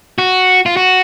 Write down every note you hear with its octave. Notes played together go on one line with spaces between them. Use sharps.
F#4
F4
F#4